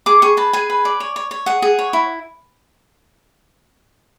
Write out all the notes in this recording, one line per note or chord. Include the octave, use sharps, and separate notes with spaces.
G#4 D6
G#4 C#6
B4 A5
G#4 G#5
B4
D5
C#5
C#5
C#5
G#4 F#5
G#4
C#5
E4